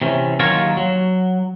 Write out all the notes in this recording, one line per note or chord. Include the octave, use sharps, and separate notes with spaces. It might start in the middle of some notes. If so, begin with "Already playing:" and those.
C3 E3 C#4
D#2 F#3 F4 A#4 C#5
F#3